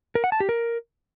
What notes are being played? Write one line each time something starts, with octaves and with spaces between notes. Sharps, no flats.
A#4
F#5
A5
G4
A#4